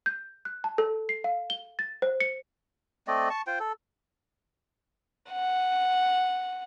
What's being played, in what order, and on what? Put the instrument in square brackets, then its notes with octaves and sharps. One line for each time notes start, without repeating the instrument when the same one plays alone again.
[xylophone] G6
F#6
A5
A4
C7
F5
G7
A6
C5
C#7
[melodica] A3 C4 D5 D#5
A5 C#6
F4 C5 G5
A4
[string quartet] F#5